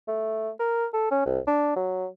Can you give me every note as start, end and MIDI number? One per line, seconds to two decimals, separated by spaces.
0.08 0.50 57
0.59 0.86 70
0.93 1.08 69
1.11 1.21 61
1.26 1.39 36
1.47 1.72 62
1.76 2.07 54